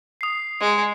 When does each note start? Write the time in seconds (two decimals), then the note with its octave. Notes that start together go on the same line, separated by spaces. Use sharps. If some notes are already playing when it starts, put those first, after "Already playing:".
0.21 D#6 C7
0.60 G#3